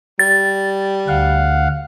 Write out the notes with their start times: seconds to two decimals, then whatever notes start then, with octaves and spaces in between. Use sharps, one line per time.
0.19 G3 A6
1.08 D2 F5 F#5